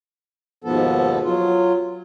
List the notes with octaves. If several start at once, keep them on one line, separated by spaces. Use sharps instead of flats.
D#2 G#2 B2 F3 B3 A4
F#3 F4